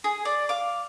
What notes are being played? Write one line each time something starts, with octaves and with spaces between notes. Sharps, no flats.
G#4
D5
F5 D6